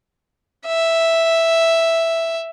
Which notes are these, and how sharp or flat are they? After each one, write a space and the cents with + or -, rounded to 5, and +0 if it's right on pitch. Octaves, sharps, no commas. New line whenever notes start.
E5 +0